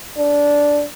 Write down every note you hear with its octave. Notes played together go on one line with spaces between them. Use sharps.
D4